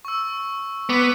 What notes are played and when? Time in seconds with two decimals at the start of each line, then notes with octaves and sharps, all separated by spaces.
0.05 C#6 E6
0.90 B3 D6 B6